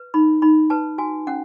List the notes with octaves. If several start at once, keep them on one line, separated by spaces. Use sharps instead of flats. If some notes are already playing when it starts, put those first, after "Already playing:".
Already playing: B4
D#4 B5
D#4 B5
B4 A5
F#4 G#5
C#4 F#5